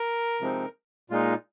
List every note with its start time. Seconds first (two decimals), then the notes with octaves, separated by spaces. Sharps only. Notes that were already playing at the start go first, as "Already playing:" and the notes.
Already playing: A#4
0.41 C3 F3 G#3 C4 D#4
1.10 A#2 G#3 D#4 F4